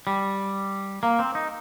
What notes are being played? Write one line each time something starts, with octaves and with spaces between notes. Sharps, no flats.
G3
A#3
C4
D#4